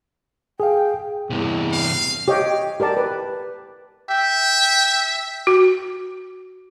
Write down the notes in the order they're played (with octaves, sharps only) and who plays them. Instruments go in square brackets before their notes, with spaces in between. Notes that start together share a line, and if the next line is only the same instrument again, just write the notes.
[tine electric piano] G#4 F5 [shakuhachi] G5
[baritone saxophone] E2 [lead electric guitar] G2 C3
[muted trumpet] F5
[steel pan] G4 C#5 D#5 F5 G5
G4 A#4 D5 A5
B4
[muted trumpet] E5 [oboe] G5
[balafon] F#4